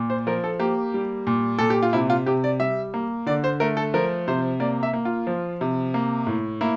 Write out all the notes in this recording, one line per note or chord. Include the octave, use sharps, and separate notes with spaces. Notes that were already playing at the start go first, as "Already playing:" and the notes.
Already playing: A#2
C5
F3 A#4
A4
A#3 G4
G3
A#2
A#2 A4
G4
F4
C3 E4
F4
C3 G4
D5
G3 E5
A#3
D3 D5
C5
A3 A#4
A4
F3 A#4
C3 C5
A#3 D5
E5
A#3
F4
F3
C3
A#3
A2
A#3 E4